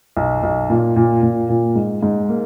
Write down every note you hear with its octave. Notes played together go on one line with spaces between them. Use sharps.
B1
B1
A#2
A#2
A#2
A#2
G#2
G#2
A#3